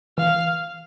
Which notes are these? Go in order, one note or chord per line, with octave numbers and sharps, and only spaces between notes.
E3 F5